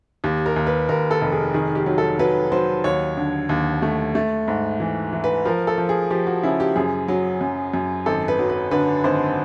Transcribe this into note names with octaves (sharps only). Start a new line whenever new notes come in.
D#2 G4
A#4
D#2
B4
D#2 A#4
A4
F1
G#4
D#3 G#4
G4
F#3
A4
F#3 B4
F#3 C5
D#2 C#5
D3
D#2
A3
A3
G#2
E3
E3
B4
F3 A#4
A4
F3
G#4
F3 G4
F#4
C#3 E4
G4
F#2 G#4
F#3
F#2
F#2
G#1 A4
B4
F#3
B4
D3 B4
G#1 C5